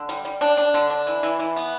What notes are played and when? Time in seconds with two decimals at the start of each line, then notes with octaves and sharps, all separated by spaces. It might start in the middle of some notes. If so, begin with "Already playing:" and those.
Already playing: D3
0.09 G3
0.25 G3
0.41 D4
0.57 D4
0.74 D3
0.90 D4
1.07 E3
1.23 E3
1.40 E3
1.56 B3